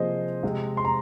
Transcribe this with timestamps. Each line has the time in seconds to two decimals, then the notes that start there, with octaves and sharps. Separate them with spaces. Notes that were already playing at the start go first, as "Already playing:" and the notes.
Already playing: C3 F3 A#3 G#4 C5 D#5
0.43 C3 G#3 C4
0.77 C6
0.85 A#5